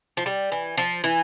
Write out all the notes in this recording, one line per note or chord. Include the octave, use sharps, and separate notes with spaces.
F3
G3
E3
F3
E3